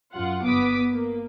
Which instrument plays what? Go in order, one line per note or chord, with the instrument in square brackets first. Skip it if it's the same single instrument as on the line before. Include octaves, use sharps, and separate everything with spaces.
[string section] F#2 F4 F#5
G1 B3 D6 D#6 B6
A#3